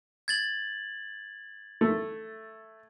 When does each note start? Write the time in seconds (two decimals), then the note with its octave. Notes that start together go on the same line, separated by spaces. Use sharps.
0.28 G#6 A6 F#7
1.81 A3